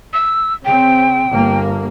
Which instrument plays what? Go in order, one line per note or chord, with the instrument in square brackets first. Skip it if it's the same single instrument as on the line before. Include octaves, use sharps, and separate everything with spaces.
[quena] E6
[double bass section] C#3 C4 [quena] G5
[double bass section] G1 A#3